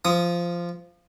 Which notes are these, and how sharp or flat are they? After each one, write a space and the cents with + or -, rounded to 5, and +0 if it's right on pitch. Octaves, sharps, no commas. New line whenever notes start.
F3 -10 D#6 +0